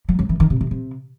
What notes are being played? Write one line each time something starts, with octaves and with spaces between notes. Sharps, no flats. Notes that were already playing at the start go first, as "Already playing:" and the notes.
F#3
F#3
E3
D#3
C3
C3
C3